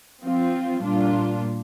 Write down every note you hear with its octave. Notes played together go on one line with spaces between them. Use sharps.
F3 C4 F4
A#2 G3 D4 F4